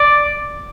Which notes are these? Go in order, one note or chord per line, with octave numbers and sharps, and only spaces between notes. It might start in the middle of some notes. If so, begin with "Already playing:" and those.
Already playing: D5